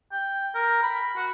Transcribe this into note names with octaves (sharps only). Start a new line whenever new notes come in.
G5
A#4
B5
F#4